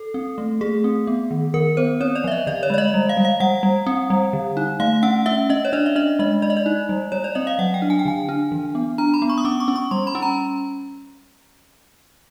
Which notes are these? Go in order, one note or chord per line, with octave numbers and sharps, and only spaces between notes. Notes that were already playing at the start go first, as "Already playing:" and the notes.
Already playing: A4
C4
A3
A3 G#4
C4
B3
D#3
D#3 A#4
B3 C5
C4 C#5
D5
F3 E5
D#5
D3 D5
C#5
G#3 D5
D#5
G3
F5
G3
F5
G3 F#5
G3
C4
G3
D3
D#4
A3 F5
C#4 F#5
C#4 E5
C#4 D#5
C#5
D4 D5
E5
D4 D#5
G#3 D#5
G#3 D5
D#5
D5
D#4
G3
G3 C#5
D5
C4 D#5
F5
F#3 F#5
G5
D4
G#5
G5
D3 G#5
D4
E3
B3
D4 A#5
B5
B3
C#6
D#6
C#4 D6
C#6
C#4
C#6
G3 C6
B5
C#4
A#5